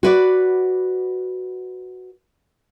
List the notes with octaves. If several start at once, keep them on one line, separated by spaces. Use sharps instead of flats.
F#4 B4 D5